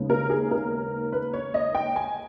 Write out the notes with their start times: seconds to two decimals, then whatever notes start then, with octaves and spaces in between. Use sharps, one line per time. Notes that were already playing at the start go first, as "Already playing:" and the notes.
Already playing: D#2 C#3 G#3 B3 D#4
0.10 A#4
0.30 G#4
0.51 A#4
1.12 B4
1.33 C#5
1.54 D#5
1.75 G5
1.96 G#5